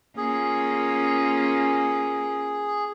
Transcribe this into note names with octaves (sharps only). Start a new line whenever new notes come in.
A#3 C#4 F4 G#4